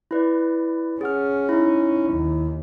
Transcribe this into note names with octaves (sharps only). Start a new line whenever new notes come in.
E4 B4 D5
C#4 G#4 F#5 F6
D#4 E4
D#2